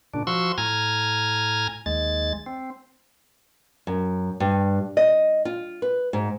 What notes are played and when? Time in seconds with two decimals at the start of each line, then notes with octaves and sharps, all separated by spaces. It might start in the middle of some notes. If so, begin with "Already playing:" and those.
0.14 A#2 C#3 D4
0.27 F3 F#4 C6 C#6 E6
0.58 A2 G#5 A#5 F6 G#6
1.86 D#2 G#3 A6
2.46 C4
3.87 F#2
4.40 G2
4.97 D#5
5.45 F4
5.82 B4
6.13 G#2